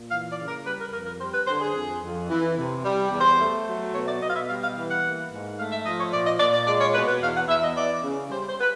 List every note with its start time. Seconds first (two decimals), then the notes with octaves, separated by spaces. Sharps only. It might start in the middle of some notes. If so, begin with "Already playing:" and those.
Already playing: A#2
0.10 E3 F5
0.29 D5
0.38 C#3
0.47 A#4
0.65 G3 B4
0.79 A#4
0.92 F2 A#4
1.06 A#4
1.20 G3 C5
1.34 B4
1.47 D3 C5
1.61 G#4
1.74 F2
2.02 F2
2.29 E3
2.57 C3
2.84 G3
3.11 E2
3.21 C5
3.39 A3
3.66 F#3
3.93 B2 C#5
4.07 D5
4.20 B2 D#5
4.30 F5
4.34 E5
4.48 G3 F5
4.62 F5
4.75 E3 F5
4.89 F#5
5.03 A#3
5.30 G#2
5.57 A3 F5
5.71 E5
5.85 F3 D#5
5.98 C#5
6.12 A#2 D5
6.25 D#5
6.39 A#2 D5
6.53 D5
6.67 G#3 D5
6.80 C#5
6.94 B2 B4
7.08 B4
7.21 E2 F5
7.35 F#5
7.48 E2 E5
7.63 D#5
7.76 E3 D5
8.03 C#3
8.30 G3 C5
8.49 C5
8.60 B4